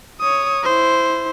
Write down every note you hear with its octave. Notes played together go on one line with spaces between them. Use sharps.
C#5 D#6
E4 C5